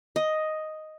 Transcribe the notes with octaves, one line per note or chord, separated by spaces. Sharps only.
D#5